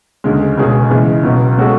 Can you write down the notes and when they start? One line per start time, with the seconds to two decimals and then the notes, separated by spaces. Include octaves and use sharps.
0.24 D2 C#3 G#3
0.57 C#2 B2 G#3 C#4 G#4
0.90 C#3 E3 G#3
1.23 C#2 B2 F#3 B3
1.58 G#3 C#4 F#4 A4